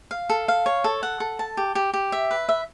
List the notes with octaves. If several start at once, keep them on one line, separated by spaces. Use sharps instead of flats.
F5
A4
F5
C#5
A4
F#5
A4
A5
G4
G4
G4
E5
B4
E5